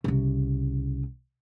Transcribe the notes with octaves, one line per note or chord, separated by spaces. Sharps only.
C2 C#3